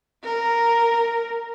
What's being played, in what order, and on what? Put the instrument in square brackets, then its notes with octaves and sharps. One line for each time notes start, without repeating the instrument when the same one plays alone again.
[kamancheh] A#4